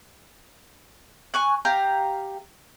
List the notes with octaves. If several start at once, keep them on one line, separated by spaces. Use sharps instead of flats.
G#5 C#6 F#6
G4 F5 A#5